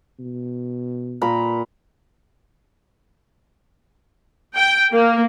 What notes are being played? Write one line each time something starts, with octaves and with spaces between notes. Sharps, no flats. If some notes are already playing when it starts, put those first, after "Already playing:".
B2
A#2 A#5 B5
G5
A#3